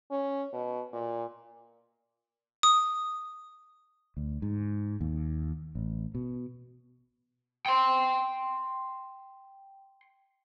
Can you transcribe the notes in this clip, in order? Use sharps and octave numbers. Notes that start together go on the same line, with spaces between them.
C#4
B2
A#2
D#6
D2
G#2
D#2
A1
B2
G5 C6